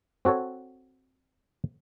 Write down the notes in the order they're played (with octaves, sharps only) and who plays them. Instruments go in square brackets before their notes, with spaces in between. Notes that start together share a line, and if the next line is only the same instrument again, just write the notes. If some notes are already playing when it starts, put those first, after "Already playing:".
[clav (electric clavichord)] C4 F#4 A4 C#5